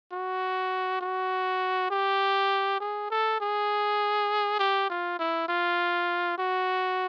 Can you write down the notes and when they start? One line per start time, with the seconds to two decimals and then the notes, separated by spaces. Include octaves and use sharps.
0.12 F#4
1.01 F#4
1.91 G4
2.80 G#4
3.11 A4
3.41 G#4
4.59 G4
4.90 F4
5.19 E4
5.49 F4
6.38 F#4